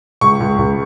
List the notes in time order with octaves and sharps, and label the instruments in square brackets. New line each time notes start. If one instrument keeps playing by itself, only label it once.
[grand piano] C#2 C#6
C#2
C#2